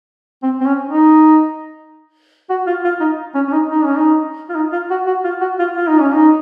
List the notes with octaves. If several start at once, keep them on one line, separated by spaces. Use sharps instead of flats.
C4
C4
C#4
D#4
F#4
F4
F4
D#4
C#4
C#4
D#4
D#4
C#4
D#4
F4
D#4
F4
F#4
F#4
F4
F#4
F4
F4
D#4
C#4
D#4